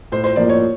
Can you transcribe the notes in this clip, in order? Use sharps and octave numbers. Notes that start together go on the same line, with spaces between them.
A2 C5
C5
F3 A#3 D5
C#5